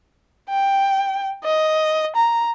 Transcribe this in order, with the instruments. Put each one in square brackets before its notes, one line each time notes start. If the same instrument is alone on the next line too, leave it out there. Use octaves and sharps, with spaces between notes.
[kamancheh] G5
D#5
A#5